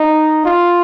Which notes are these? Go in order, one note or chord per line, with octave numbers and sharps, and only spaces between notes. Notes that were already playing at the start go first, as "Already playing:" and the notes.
Already playing: D#4
F4